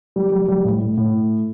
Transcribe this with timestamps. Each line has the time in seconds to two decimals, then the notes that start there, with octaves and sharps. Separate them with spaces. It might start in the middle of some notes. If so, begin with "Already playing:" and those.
0.16 G3
0.32 G3
0.48 G3
0.64 A2
0.81 A2
0.97 A2